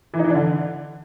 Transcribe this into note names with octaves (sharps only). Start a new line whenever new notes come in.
E3
D#4
E3
D4
D3